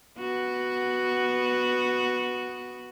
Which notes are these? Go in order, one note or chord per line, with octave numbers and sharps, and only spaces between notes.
B3 F#4